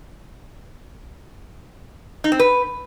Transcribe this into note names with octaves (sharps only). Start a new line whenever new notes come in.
D#4
C4
B4